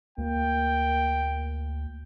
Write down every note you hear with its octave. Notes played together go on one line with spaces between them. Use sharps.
D2 A#3 G5